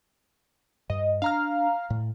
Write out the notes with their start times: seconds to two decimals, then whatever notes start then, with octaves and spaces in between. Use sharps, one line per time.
0.90 G2 D#5
1.22 D4 F5 A#5 F6
1.90 A2